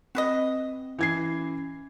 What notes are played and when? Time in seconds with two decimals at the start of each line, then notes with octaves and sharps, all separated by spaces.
0.15 C4 F#4 B4 D#5
0.99 E3 C#4 G#6 C7